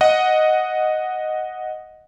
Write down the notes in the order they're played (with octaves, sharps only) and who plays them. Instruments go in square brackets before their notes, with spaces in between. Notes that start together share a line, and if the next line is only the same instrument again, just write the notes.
[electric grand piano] D#5 F#5